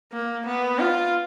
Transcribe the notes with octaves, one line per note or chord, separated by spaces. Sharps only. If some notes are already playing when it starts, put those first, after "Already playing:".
A#3
B3
F4